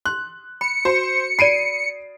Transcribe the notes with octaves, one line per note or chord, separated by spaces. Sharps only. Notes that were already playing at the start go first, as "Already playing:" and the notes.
C6 F#6
B5 C#7
F#4 C5
D5 B5 C7 D7 D#7